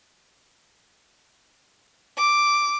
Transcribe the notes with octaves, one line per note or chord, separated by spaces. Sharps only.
D6